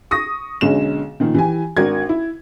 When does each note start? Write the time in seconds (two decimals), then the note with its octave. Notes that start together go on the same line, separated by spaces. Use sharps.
0.11 C#6 D#6 A#6
0.61 B1 D3 G#3 C#4 E7
1.20 A#2 D#3 F3
1.34 E3 G4 G#5
1.77 G#1 D4 F#4 A#4 G#6
2.09 E4